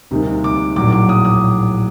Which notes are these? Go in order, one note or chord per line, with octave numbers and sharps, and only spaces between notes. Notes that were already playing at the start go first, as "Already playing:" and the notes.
D2 C3 G3 A#3 D#4
D6
A#1 A2 F#3 D6
D6
D#6
D#6